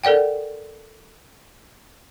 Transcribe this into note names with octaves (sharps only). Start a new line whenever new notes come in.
A4 A#4 D5 F#5 G5